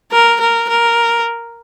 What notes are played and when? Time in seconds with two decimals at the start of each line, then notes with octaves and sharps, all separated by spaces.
0.12 A#4
0.40 A#4
0.69 A#4